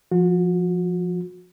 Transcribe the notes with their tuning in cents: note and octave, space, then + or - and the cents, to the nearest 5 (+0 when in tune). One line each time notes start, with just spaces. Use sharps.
F3 +0 F#4 -35